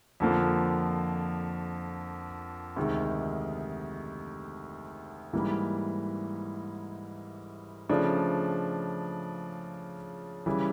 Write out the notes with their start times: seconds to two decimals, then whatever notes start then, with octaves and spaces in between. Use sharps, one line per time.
0.20 F2 D3 F3 A#3
2.76 D2 C3 D#3 G#3
5.33 G#2 E3 G3 A#3
7.89 C#3 F3 A3 D4
10.46 C#3 E3 G3